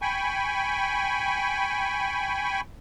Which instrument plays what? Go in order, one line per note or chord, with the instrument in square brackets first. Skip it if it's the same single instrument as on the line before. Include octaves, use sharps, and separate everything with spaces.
[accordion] G5 G#5 B5 C#6